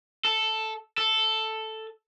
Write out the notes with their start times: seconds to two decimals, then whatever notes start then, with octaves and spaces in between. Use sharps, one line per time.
0.25 A4
0.98 A4